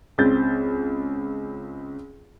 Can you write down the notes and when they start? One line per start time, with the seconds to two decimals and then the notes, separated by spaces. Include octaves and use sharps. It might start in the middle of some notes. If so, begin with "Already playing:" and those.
0.18 C#2 C4 G6 A6